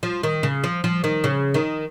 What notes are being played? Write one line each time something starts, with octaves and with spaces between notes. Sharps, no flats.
F3
D#3
C#3
F3
F3
D#3
C#3
D#3